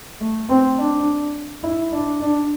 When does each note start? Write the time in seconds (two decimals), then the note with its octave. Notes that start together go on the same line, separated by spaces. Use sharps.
0.21 A3
0.49 C4
0.77 D4
1.63 E4
1.92 D4
2.21 D4